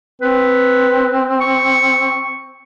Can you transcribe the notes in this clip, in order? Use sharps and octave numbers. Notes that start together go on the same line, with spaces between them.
C4 B4
C#6